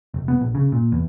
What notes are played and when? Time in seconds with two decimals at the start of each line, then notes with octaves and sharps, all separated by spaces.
0.14 F1
0.28 B3
0.41 A#1
0.55 C#3
0.72 A#2
0.92 E2